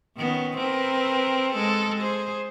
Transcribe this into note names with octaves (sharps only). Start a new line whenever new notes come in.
D#3 B3 C#4
C4 A#4 B4
G#3 A4
G#4 C5